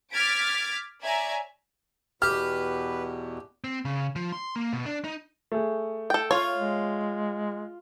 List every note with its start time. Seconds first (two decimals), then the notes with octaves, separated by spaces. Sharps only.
0.12 D6 F6 G#6 A6 B6 D7
1.03 C#5 D5 E5 G#5 A#5
2.22 E2 B2 G4 B4 F6
3.64 C4
3.85 C#3
4.16 F3
4.33 C6
4.56 A#3
4.73 B2
4.86 D4
5.04 D#4
5.52 A3 G#4
6.10 A4 G5
6.31 F4 C#5
6.57 G#3